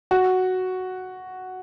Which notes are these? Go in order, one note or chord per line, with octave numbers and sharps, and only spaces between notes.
F#4